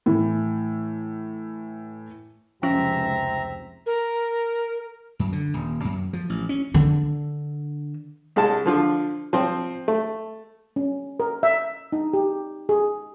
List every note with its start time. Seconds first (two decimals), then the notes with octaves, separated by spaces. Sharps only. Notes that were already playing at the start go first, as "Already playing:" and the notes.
0.06 A2 E3 A3
2.63 F1 C#2 F3 C4 C#4 F4 E5 A#5
3.86 A#4
5.19 F#2
5.33 D3
5.54 D#1
5.84 F#2
6.13 F3
6.30 A1
6.49 C#4
6.74 D3
8.36 C2 G#3 A5
8.66 D3 F3 F4
9.33 F3 C4
9.88 A3
10.76 C#4
11.20 A#4
11.43 E5
11.92 D#4
12.13 G4
12.69 G#4